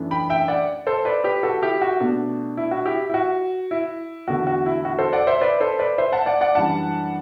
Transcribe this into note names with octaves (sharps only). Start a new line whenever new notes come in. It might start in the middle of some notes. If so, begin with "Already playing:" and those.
Already playing: F#2 E3 A3 D4
G5 B5
E5 G5
D5 F#5
A4 C5
B4 D5
G4 B4
F#4 A4
E4 G4
F#4
B2 A3 D4
E4
F#4
E4 G4
E4
F#4
E4
E2 D3 A3 F#4
F#4
E4
F#4
A4 C5
D5 F#5
C5 E5
B4 D5
A4 C5
B4 D5
C5 E5
F#5 A5
D5 F#5
D5 F#5
F#2 E3 G3 D4 F#5 A5